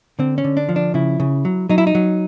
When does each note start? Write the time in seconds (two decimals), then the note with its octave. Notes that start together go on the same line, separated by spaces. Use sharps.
0.19 D3 C4
0.38 C#4
0.44 D3
0.57 D4
0.69 F3
0.76 D4
0.94 C#3 E4
1.20 C#3
1.45 F#3
1.69 F#3 D#4
1.78 E4
1.87 D#4
1.95 F#3